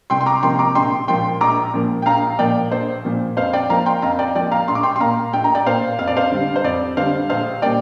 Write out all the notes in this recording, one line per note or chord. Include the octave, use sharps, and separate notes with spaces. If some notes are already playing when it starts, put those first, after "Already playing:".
C2 G5 C6
C6
A#5 D6
C3 F3 A#3 G5 C6
A#5 D6
A#1 G5 C6
A#2 F3 A#3 G5 C6
A#1 A#5 D6
A#2 F3 A#3
G5
A#1 F5 A#5
A#2 F3 A#3 D5 G5
A#1 C5
A#2 F3 A#3
F2 C5 F5
D5 G5
F3 A#3 F5 A#5
G5 C6
F2 F5 A#5
D5 G5
F3 A#3 D5 G5
F5 A#5
A#1 C6
D6
G5 C6
C6
A#2 A#3 F5 A#5
A#1 G5
A#5
D5 G5
A#2 A#3 C5 F5
F2 F5
D5
C5 F5
D3 G3
C5
F2 D5
D3 G3 C5 F5
A#1 C5 F5
A#2 G3 A#3 D5 G5